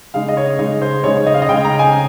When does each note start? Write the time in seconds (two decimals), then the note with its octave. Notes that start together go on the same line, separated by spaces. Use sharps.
0.14 C#3 G#3 D#4 F5
0.28 D#5
0.37 C#5
0.59 C#3 G#3 D#4
0.81 C5
1.04 C#3 G#3 D#4 C#5
1.27 D#5
1.34 F5
1.42 D#5
1.48 C#3 G#3 D#4 G5
1.64 A#5
1.79 G#5